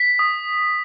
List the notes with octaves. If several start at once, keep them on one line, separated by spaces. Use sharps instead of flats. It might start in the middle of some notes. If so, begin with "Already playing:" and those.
Already playing: B6
D#6